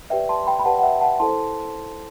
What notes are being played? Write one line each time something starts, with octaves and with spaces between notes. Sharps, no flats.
G4 B4 D5 E5 G5
A5 C6
G5 B5
B5
G4 B4 D5 F#5 A5
F#5
E5 G5
F#5 A5
E4 A4 C5 A5 C6